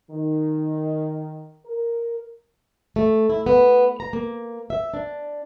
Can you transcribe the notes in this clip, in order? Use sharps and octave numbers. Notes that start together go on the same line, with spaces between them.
D#3
A#4
A3
E4
B3
A#5
A#3
E5
D4